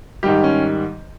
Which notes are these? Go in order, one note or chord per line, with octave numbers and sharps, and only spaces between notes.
G#2 D#3 G3 G4
C#4